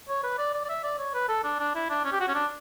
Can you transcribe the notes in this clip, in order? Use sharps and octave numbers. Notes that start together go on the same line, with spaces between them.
C#5
B4
D5
D5
D5
E5
D5
C#5
B4
A4
D4
D4
E4
D4
C#4
G4
F#4
C#4
D4